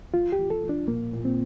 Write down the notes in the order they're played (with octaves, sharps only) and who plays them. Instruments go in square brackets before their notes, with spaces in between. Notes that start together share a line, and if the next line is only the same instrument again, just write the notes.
[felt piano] F3 [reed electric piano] F4
[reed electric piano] G4
[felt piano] F3
[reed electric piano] A4
[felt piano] F3
[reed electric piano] D4
[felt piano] A#2 [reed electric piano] A#3
[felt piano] A#2
[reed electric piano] C4